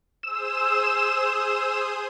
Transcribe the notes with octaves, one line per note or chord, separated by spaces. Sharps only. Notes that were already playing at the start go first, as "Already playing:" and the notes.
G#4 C5 D#6 E6